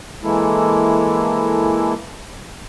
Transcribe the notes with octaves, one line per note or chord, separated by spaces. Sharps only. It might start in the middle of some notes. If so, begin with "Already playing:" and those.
E3 G#3 A#3 E4 A4